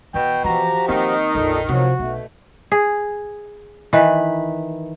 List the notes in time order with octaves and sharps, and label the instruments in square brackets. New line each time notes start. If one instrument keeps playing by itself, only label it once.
[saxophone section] B2 [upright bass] E3 [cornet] G5
[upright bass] E3 [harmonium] F3 F#4 G4 [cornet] A#5
[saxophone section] D#3 [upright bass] A#3 C4 [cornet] D#4
[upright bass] A#1 F2 [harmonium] A#2 A4
[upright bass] C3 [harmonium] F3 F#3 [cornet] F#4
[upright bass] B1 [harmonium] B2 A3
[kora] G#4
D#3 E3 B4